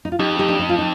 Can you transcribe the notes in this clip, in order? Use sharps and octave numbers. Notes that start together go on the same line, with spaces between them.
D#4
F4
F2 D#4 G4
D#4 G4
D4
D#4
F4
D#4